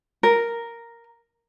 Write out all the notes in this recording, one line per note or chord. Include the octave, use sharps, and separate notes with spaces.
A#4